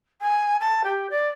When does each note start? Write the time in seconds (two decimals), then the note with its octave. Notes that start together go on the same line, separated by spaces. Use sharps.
0.21 G#5
0.60 A5
0.84 G4
1.10 D5